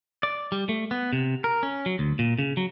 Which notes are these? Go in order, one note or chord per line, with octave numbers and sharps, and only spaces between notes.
D5
G3
A3
B3
C3
A#4
C#4
F#3
D2
A#2
C#3
F#3